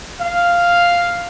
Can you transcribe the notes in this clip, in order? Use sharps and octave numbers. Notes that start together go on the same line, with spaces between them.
F5